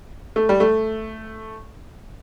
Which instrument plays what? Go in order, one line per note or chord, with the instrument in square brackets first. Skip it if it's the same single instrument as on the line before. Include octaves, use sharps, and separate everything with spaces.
[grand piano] A3
G3
A3